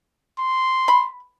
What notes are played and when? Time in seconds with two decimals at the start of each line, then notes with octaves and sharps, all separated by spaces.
0.39 C6
0.88 B5